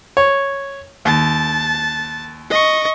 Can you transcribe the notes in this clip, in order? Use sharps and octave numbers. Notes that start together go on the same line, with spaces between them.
C#5
D#2 A5
D#5 C#6